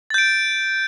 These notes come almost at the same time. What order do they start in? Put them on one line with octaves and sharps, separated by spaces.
A6 G6 D7